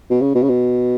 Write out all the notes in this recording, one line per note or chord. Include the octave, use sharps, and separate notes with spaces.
B2
C#3
B2
C#3
B2